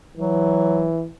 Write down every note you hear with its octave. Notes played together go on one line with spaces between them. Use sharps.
E3 F#3